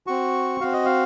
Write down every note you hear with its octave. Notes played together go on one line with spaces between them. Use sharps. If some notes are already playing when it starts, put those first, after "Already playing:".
C4 F#4 C#6
C4 F#4 F5
D#5
F5